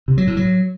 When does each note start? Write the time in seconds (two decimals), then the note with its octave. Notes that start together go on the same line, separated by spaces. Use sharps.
0.08 C3
0.18 F#3
0.27 A2
0.37 F#3